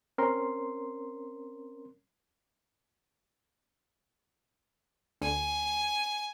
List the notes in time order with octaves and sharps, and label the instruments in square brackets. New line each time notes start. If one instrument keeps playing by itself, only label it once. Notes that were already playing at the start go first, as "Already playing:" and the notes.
[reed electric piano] C4 C#4 A#4 C6
[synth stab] D2 [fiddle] G#5